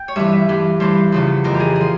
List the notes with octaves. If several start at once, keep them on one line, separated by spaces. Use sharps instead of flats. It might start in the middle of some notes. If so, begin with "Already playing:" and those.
Already playing: G5
C#5
G2 E3 E5
E5
G2 E3
G2 E3 C5
E2 C#3 F3
F2 E3 A#4
G4
G#4
F3 G#4